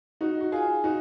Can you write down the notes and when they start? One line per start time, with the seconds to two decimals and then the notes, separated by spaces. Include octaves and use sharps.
0.21 D#4 F#4
0.41 F#4
0.52 F4 G#4
0.84 D#4 F#4